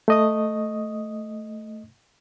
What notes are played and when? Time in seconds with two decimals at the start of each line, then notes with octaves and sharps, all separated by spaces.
0.08 A3 D#5 D#6